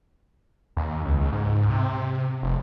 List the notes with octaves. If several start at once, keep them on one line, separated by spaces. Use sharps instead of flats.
D#2
C#2
G#2
C3
F1